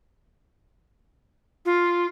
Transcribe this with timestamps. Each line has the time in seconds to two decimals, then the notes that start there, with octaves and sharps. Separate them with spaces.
1.65 F4